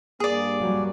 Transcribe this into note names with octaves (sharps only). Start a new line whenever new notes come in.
G2 A#3 G#4 D5
F#3 G3